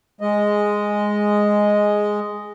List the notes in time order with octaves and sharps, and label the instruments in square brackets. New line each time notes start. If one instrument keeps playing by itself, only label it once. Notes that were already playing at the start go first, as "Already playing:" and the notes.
[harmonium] G#3 D#5